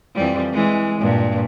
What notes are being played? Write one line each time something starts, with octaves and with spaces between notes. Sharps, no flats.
F2 E3 G3
E3 G#3
G2 A#2